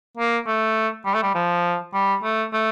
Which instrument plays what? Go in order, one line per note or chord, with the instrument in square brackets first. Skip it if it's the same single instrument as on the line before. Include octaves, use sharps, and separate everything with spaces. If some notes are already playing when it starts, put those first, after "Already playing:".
[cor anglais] A#3
A3
G3
A3
G3
F3
G3
A3
A3